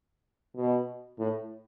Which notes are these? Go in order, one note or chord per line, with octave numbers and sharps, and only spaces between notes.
B2
A2